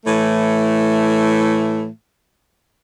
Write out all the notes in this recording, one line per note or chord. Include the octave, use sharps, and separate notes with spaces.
A2 E3 A3